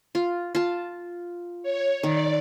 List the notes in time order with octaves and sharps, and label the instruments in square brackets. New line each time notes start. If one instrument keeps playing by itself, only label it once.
[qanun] F4
F4 A5
[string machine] C#5
[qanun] D#3 [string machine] D5